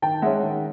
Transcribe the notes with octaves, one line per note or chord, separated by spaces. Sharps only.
D#3 G5 A5
G#3 C#4 E5 F#5
D#3